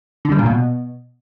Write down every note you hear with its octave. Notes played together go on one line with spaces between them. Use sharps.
D3
G3
A#2
B2